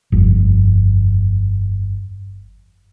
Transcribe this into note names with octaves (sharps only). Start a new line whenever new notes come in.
G1 F2